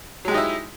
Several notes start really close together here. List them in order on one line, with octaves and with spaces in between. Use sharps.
F#3 G#3 G4 D#4 E4